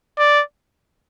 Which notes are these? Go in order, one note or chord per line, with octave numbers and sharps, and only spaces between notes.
D5